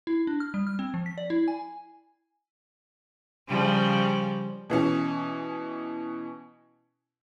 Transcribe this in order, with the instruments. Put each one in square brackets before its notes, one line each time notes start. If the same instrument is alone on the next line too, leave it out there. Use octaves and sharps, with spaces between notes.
[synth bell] E4
D4
F6
G3
F6
C4
F3
B6
D5
E4
G#5
[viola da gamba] C#3 F3 G3
[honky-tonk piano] B2 E3 C#4